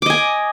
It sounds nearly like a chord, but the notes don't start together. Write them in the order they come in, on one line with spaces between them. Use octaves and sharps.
D6 D#5 G#5